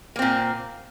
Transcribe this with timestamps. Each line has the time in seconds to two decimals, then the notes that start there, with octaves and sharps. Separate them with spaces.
0.16 A#3
0.19 C4
0.22 A#2